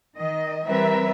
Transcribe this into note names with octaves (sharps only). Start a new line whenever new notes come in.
D#3 D#5
E3 G3 C4 A#4 B4 E5